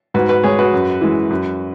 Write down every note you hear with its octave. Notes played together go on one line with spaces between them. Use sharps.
G#2 F#4 B4
F#4 B4
G#3 G#4 C#5
F#4 B4
F#2
E3 G#3
F#2